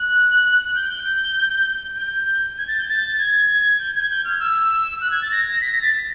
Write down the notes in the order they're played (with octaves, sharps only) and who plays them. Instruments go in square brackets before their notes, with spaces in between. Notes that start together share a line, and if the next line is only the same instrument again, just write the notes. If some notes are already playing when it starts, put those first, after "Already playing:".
Already playing: [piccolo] F#6
G6
G6
G#6
A6
G6
A6
G#6
G6
G#6
G6
F6
E6
F#6
G#6
A6
A#6
B6
A#6
A6